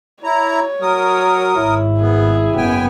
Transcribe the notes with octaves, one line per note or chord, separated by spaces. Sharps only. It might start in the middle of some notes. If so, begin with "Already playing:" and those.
E4 C#5 A#5
F#3 A#4 D#6
G#1 G#2 E4
B3 G#4
F#1 F#2 B3 G5 G#5